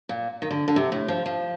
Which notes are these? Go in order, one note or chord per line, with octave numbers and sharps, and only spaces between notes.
A#2
D#3
D3
D3
C3
A2
F3
F3